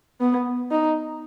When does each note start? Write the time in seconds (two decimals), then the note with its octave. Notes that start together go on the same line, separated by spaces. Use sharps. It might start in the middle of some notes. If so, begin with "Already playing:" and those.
0.20 B3
0.71 D#4